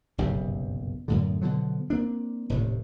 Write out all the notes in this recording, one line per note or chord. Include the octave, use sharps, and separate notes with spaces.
F#1 B1 G2 C3
F#2 A2 D3
B2 D3 F3 F#3
A#3 C4 D4
F1 D#2 A2 C3